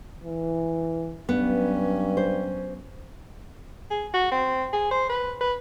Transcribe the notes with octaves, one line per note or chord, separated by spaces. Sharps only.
E3
G2 F#3 B3 C#4
C5
G#4
F#4
C4
G#4
C5
B4
B4